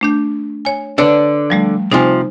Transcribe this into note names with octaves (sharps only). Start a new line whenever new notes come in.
A3 D4 G6
C#5 G#5
D3 D4 B4 C#5 E6
F3 G3 A3
C3 F3 D#4 C5 G#5